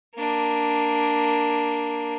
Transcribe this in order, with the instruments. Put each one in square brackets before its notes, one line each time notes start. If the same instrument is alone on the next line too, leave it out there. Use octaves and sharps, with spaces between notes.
[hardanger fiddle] A#3 D4